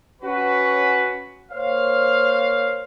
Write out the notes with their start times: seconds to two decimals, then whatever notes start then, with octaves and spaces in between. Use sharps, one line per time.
0.23 C#4 F#4 B4
1.52 A#3 C5 C#5 F5